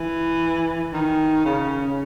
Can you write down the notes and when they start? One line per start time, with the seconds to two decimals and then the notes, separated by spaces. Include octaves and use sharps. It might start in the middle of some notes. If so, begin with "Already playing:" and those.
Already playing: E3
0.93 D#3
1.45 C#3